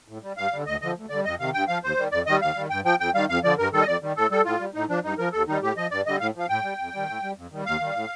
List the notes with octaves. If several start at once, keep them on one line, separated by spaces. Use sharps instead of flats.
A2
G3
G2 F5
D3 G3
D2 D#5
D3 F3 D#5
D2
D3 G3 D5
F2 D#5
C3 D#3 F5
G2 G5
F3 F5
D#2 C5
D#3 G3
F2 D5
D#3 G3 D#5
D#2 F5
D#3 G3
G2 G5
F3 G5
F2 G5
D#3 G3 F5
F2 F5
D3 F3 D5
G2 A#4
D#3 G3 A4
D#5
F2 D5
D#3 G3
A2 A4
G3 A4
A2 F4
G3
A2 D#4
F3 D4
G2 D#4
F3 A#4
D#2 A4
D#3 G3 D#4
A2 G4
F3 D#5
G2 D5
D3 G3 D#5
A2 F5
F3 F5
A2 G5
G3
F2
D#3 G3
A2
G3
F2
D#3 G3
D#2 F5
D#3 G3
A2